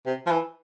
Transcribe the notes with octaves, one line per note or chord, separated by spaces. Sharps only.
C3
F3
E3